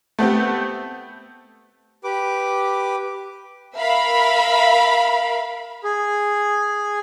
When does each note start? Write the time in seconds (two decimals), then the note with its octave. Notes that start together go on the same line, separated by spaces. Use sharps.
0.19 A3 B3 C4 G4
2.04 G4 B4 D6
3.77 A#4 E5 F5 B5
5.84 G#4